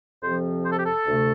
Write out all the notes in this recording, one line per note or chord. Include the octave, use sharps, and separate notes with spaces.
F2 C3 F3 C4 C5
C5
A4
G4
A4
D2 C3 A3